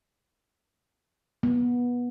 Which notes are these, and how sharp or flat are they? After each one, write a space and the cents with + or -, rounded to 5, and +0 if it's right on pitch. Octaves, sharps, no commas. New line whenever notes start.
B3 -20